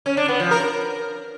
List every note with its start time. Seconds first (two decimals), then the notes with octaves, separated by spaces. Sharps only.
0.06 C#4
0.17 D4
0.28 B3
0.40 F3
0.51 A#4